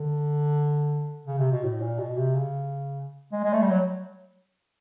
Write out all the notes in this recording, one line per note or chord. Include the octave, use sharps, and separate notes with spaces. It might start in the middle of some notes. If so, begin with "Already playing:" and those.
Already playing: D3
C#3
C3
B2
A2
A#2
B2
C3
C#3
G#3
G#3
A3
G3
F#3